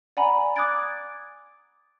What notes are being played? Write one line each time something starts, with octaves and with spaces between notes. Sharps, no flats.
D5 F#5 G#5 A#5 B5
D6 D#6 F#6 G#6 A6 D7